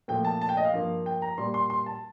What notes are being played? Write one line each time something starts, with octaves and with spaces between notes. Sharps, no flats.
A#2 F3 A3 G5
A5
A5
G5
D#5
F5
G2 F3 A#3
G5
A#5
A#2 G3 A#3 C6
C6
C6
A5